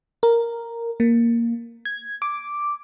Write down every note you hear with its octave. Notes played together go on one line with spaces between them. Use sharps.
A#4
A#3
G#6
D6